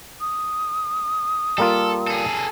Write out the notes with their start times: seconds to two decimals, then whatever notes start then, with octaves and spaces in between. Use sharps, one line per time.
0.21 D#6
1.58 G3 A#3 F4 A4
2.07 G#4 A4